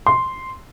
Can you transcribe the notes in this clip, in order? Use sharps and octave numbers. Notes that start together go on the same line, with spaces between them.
C6